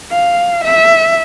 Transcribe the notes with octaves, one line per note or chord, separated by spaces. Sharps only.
F5
E5